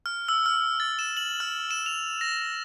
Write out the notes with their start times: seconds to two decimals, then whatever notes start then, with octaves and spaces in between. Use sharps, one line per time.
0.06 F6
0.29 E6
0.46 F6
0.80 A6
0.99 E7
1.17 F#7
1.40 F6
1.71 E7
1.86 F7
2.21 A#6